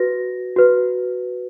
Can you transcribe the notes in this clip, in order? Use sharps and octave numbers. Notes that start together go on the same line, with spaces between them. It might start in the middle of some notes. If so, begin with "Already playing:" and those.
Already playing: F#4 B4 A#6
F#4 B4